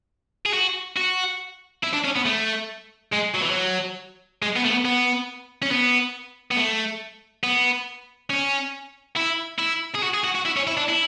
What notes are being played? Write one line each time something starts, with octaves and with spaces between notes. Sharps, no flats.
G#4
F#4
F#4
E4
D4
C#4
B3
A3
G#3
F#3
E3
F#3
G#3
B3
A3
B3
B3
C#4
B3
B3
A3
B3
C#4
E4
E4
G#4
F#4
G#4
F#4
F#4
E4
C#4
E4
D4
E4